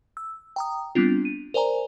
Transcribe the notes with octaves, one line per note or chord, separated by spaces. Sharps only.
E6
G5 A#5 D#6
G3 B3 C4 D4 F4
D#7
A#4 C5 D5 G#5 A#5